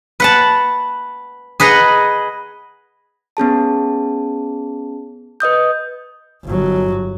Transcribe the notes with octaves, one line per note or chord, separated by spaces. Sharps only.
B4 F#5 A5
G#4 B4 D#5 F#5 A#5
B3 C#4 G#4 A5
B4 D#5 D#6 G6
G1 F#3